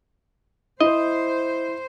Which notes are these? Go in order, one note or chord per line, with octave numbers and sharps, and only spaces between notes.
E4 C5 D#5